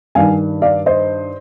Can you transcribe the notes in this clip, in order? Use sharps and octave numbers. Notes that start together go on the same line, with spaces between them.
G2 D#3 F5 G#5
D5 F5
C5 D#5